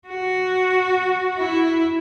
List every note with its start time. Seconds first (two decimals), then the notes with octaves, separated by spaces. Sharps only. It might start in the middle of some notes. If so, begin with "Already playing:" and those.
0.08 F#4
1.37 E4